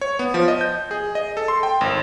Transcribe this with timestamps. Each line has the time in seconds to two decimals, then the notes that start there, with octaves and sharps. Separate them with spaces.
0.01 C#5
0.19 B3
0.34 F3
0.48 D#5
0.61 G6
0.91 G#4
1.15 D#5
1.37 A4
1.48 C6
1.63 G5
1.81 G#1